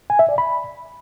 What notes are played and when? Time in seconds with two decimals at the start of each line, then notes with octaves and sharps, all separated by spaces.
0.10 G#5
0.19 E5
0.29 D5
0.38 B5